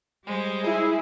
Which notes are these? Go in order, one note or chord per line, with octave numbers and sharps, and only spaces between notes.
G3 G#3 C5
E4 G#4